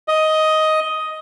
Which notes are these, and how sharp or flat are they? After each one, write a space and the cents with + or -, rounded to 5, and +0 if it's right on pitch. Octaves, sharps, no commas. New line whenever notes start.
D#5 +10